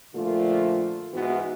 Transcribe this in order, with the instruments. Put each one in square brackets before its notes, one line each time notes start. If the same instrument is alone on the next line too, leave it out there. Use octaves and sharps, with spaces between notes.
[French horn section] A#2 D3 F3 A3 F4
G#2 E3 B3 E4 F#4